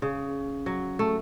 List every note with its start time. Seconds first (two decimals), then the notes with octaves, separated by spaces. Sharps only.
0.02 C#3
0.66 F#3
0.99 A3